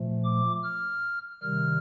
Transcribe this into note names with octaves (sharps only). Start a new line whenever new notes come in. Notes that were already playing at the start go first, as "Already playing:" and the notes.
Already playing: A#2 F3 A3
D6
F6
C3 D#3 G3 F6